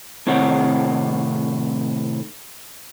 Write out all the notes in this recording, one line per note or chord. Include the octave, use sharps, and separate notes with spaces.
A2 C3 D#3 C4 C#5 F#5